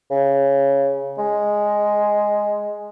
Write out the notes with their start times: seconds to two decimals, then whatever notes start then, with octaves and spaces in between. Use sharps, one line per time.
0.11 C#3
1.18 G#3